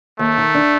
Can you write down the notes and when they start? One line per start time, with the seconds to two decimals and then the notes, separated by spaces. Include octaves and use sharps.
0.19 D#2 A3
0.38 D#3
0.54 D4